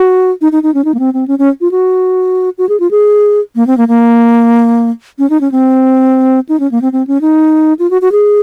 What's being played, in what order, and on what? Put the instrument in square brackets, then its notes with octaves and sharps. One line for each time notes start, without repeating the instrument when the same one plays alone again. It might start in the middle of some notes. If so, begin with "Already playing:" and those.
Already playing: [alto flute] F#4
D#4
D#4
D#4
C#4
D#4
A#3
C4
C4
C#4
C#4
F4
F#4
F#4
G#4
F4
G#4
A#3
C4
A#3
A#3
C#4
D#4
C#4
C4
D#4
C#4
A#3
C4
C4
C#4
D#4
F4
F#4
F#4
G#4